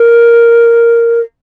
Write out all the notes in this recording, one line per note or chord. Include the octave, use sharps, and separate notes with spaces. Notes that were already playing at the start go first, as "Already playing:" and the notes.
Already playing: A#4